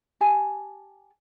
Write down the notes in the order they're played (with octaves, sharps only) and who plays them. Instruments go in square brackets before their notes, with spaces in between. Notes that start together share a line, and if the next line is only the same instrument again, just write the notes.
[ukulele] G4 G#5 A5